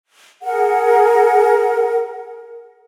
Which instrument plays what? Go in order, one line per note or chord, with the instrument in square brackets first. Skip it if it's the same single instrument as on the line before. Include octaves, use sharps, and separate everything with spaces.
[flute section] G#4 A#4 F#5